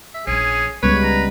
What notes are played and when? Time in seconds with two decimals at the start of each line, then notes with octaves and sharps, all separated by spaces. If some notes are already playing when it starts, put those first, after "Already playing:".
0.15 E5
0.27 A#1 F3 C#4 G#4
0.83 C#2 C#3 G3 G#3 B3 B4 C#5
1.03 A#5